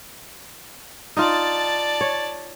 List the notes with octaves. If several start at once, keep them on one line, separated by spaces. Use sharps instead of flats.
D#4 F4 D5 A5
C#5